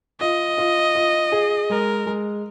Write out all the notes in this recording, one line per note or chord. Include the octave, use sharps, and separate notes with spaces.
F4 D#5
F4
F4
G#4
G#3 A#4
G#3